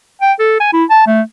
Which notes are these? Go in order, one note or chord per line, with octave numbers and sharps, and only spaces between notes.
G5
A4
G#5
E4
A5
A3